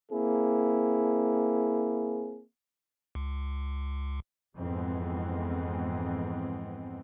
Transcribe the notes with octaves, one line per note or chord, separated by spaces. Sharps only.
A#3 C4 E4 G#4
C#2
F2 G#2 E3 G#3 B3 C4